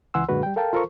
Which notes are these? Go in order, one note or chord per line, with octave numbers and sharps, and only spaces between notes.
C#2 E3 F#5 G#5 C6 E6
F#2 A#2 D3 G#3 F#4 B4
G3 G5
A4 A#4 F5 G5 A5
F4 A4 A#4 C5 C#6